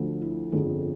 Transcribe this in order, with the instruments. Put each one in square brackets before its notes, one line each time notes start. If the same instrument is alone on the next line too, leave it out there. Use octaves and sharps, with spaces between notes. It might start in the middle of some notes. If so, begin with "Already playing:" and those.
Already playing: [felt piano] D2 D3 F3
E4
G1 F2 D3 G#4